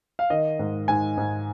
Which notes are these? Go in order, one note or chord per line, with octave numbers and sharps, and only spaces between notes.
F5
D#3 D#5
G#2
G#2 G#5
G#2